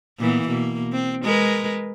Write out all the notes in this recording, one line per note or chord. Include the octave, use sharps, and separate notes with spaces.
A#2 E3 B3
B2 A#3
C4
G#3 A#4 B4